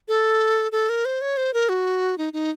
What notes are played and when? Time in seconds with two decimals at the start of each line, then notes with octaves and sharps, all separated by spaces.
0.08 A4
0.72 A4
0.89 A#4
1.05 C5
1.21 C#5
1.37 C5
1.54 A#4
1.69 F#4
2.18 D#4
2.33 D#4